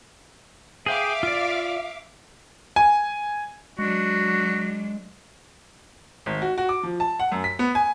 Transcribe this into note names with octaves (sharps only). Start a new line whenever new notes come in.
G#4 E5 F5 G5 D6
F4 D5
G#5
F#3 G#3 D4 F#4
G#1
F#4
F#4
D6
F3
A5
F#5
F#2
B6
B3
G#5